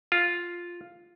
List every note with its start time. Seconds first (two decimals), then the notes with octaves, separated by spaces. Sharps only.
0.12 F4